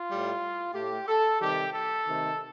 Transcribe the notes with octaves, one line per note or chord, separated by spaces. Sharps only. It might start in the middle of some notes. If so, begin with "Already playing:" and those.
Already playing: F4
A2 G3
A2 A3 G4
A4
C3 D#3 G3 G4
A4
C3 D#3 A3